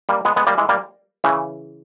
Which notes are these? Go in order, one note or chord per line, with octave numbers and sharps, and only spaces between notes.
G3 A#3
G#3 B3
G#3 B3
G3 A#3
E3 G#3
G3 A#3
C#3 E3